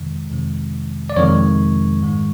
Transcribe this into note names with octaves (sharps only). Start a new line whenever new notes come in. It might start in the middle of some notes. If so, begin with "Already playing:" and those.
Already playing: F2 C3 D#3 G#3
F2 C3 D#3 G#3
D5
F2 C3 D#3 G#3 C#5
G#2 D#3 G#3